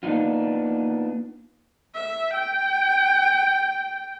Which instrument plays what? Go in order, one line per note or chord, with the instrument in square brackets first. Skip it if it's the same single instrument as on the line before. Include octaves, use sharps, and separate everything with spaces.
[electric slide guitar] A#3 B3 D4 D#4 F4
[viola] E5
G5